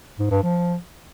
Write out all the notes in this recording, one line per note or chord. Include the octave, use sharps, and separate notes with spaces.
G#2
G2
F3